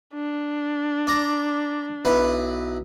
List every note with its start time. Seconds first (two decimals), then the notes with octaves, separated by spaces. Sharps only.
0.14 D4
1.07 D5 A#5
2.05 B1 E4 B4